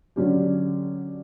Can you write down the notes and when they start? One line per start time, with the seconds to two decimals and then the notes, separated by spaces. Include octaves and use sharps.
0.16 D3 F#3 C#4 G4